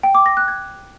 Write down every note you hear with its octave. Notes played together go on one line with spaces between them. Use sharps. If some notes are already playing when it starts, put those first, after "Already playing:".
G5
D6
A#6
F#6
G#6